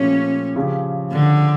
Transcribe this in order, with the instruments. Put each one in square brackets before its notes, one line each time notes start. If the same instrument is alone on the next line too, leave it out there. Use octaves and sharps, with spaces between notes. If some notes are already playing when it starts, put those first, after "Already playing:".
Already playing: [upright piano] A#2 F3 A3 G4 [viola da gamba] C#4
[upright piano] C#3 F3 C#4 G4
[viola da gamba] D3